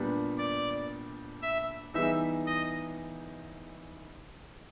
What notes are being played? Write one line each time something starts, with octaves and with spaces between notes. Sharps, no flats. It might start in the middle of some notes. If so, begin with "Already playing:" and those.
Already playing: A#2 G3 B3 D4
D5
E5
E3 G3 B3 D#4 G#4 E5
D#5